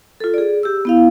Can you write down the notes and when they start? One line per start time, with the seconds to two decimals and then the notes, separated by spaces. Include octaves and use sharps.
0.20 F4 A4
0.34 G#4 D5
0.63 G4 E6
0.85 B3 E4 F5